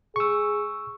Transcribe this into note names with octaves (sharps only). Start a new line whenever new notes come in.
G#4 C#6 E6